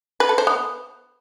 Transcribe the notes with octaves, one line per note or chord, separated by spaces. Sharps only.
B4
A4
C5
B3